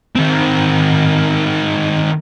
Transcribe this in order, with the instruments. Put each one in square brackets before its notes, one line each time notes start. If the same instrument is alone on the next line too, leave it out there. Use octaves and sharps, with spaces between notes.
[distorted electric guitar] D#3 C4